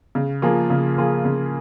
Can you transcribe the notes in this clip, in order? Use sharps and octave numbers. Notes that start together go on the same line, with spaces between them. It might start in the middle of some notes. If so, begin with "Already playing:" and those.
C#3
F3 A#3 F4 G#4
C#3
F3 A#3 F4 G#4
C#3